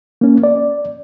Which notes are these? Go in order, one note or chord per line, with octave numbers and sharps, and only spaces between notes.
A#3 C#4
D5